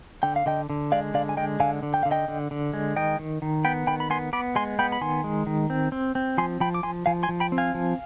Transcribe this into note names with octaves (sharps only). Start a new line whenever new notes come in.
D3 G5
F5
D3 D#5 G5
D3
G#3 D5 F5
D3 D5 F5
G#5
G#3 D#5 G5
D3 F5 G#5
D3
G5
D3 F5
D#5 G5
D3
D3
G#3
D#3 D#5 G5
D#3
D#3
B3 G5 B5
D#3 G5 B5
B5
B3 G#5 C6
B3 B5 D6
G#3 G#5 C6
B3 G5 B5
B5
D#3 G#5 C6
G#3
D#3
C4
C4
C4
F3 G#5 C6
F3 G5 B5
D6
F3 G#5 C6
F3 F5 G#5
G#5 C6
F3
G5 B5
C4
F5 G#5
F3